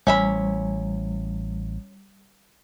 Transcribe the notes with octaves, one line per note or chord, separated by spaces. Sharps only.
A1 G3 C#4 E5 B5